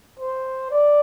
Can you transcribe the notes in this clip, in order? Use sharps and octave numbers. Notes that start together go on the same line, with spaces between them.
C5
D5